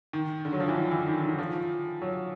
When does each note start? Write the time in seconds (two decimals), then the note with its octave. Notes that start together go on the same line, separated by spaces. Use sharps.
0.13 D#3
0.45 D3
0.53 F#3
0.60 F3
0.68 E3
0.76 D#3
0.91 E3
1.08 D#3
1.23 D#3
1.39 F3
2.01 F#3